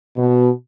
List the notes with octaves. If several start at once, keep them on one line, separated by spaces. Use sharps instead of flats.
B2